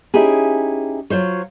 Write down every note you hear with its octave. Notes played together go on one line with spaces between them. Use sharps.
C#4 D#4 E4 G4 G#4
F#3 F4 C5 C#5